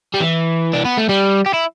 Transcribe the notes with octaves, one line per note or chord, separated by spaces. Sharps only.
G3
E3
D4
B3
A3
G3
G4
E4